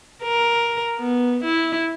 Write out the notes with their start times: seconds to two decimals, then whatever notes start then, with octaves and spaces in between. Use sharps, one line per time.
0.23 A#4
0.99 B3
1.44 E4